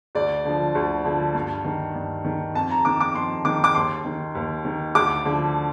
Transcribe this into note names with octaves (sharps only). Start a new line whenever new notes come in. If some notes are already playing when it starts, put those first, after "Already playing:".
D2 D5
D3 F3
D2
D3 F3
G2
D#3
G2
D#3
F2 A5
A#5
D#3 D6
D6
F2 C6
D#3 D6
D6
D#2 C6
D#3
D#2
D#3
D2 D6
D3 F3